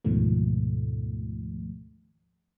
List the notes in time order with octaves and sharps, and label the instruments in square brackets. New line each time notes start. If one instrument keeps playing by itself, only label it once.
[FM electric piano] D2 G#2 B2 D#3 F3 A3